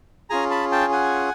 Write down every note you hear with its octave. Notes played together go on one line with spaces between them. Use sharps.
C#4 F4 G#4 G#5 A#5
A5 B5
G5 A5
F#5 G#5